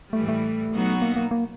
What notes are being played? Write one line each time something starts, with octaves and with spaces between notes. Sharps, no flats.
A2 E3 G3 A3
A3
B2 F#3 B3 D#4 F#4
A#3
A#3
A#3